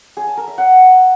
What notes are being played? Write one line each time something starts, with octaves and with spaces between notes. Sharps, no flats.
G#4
A5
A#4
E5
F#5